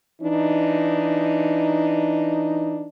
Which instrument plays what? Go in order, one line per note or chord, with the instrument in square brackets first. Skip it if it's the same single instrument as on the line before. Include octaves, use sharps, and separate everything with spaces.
[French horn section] E3 D4 D#4